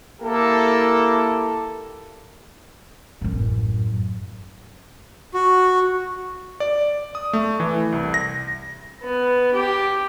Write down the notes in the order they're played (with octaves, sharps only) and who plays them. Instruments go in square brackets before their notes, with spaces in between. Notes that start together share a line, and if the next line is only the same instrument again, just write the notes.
[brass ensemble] A#3 E4 G4 A4
[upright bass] A1 F#2
[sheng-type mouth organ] F#4
[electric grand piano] D5
D#6
A3
E3
C2
A#6
[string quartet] B3
G4